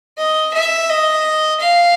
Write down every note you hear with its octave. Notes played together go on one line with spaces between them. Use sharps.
D#5
E5
D#5
F5